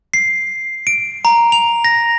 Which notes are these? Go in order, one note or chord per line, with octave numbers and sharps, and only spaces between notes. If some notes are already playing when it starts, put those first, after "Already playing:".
C7
D7
A#5
F7
A#6